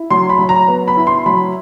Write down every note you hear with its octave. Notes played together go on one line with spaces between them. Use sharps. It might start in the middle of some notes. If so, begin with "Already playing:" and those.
Already playing: E4
F#3 C6
B5
F#3
A#5
B3
B5
E4
C6
F#3 B5